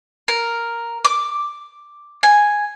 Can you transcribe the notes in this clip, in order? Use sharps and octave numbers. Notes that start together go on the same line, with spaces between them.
A#4
D6
G#5